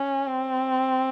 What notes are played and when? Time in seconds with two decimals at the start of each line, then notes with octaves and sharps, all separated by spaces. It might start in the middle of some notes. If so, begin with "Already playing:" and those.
Already playing: C#4
0.27 C4